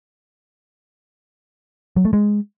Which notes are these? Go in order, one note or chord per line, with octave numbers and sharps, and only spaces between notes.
F#3
A3
G#3